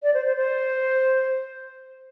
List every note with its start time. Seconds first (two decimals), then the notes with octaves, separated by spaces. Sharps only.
0.03 D5
0.14 C5
0.26 C5
0.37 C5